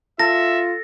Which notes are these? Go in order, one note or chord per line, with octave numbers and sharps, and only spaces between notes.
F4 A4 E5 A#6